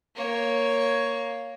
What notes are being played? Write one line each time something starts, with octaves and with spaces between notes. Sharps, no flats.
A#3 C#5